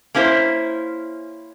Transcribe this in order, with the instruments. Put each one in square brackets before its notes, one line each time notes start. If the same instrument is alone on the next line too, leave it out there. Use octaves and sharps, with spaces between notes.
[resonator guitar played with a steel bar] A#3 C#4 E4 A#4 C5